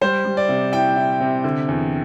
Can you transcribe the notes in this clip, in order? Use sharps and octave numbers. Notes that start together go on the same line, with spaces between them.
G3 C5
G3
D5
C3
E4 G5
E4
C3
D3
E2